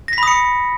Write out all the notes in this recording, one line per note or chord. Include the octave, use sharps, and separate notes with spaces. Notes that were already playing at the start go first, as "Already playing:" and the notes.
B5 D#6 A#6 B6 C#7